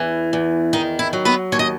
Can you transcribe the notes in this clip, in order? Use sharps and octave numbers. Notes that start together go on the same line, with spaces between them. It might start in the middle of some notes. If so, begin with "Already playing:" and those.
Already playing: E2 E3
E2
D#3 D#4
E4
F#3
B3 B4
D#2 C#5
D#5